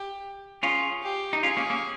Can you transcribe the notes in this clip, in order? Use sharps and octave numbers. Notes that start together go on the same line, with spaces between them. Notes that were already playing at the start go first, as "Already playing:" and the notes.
Already playing: G4
C#4 F4 G#4
G4
D#4
C#4 F4 G#4
A#3 C#4
A#3 C#4